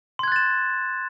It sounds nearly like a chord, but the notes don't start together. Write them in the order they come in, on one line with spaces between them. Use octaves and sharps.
C6 G#6 F#6 A6 E7